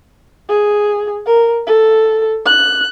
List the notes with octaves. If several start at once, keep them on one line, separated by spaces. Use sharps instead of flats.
G#4
A#4
A4
F#6